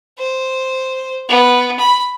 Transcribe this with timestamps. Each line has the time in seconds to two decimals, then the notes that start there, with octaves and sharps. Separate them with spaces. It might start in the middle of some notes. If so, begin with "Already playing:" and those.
0.18 C5
1.29 B3
1.79 B5